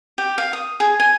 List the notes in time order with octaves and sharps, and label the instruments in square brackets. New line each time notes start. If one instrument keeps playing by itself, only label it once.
[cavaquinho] G4
F5
D#6
G#4
G#5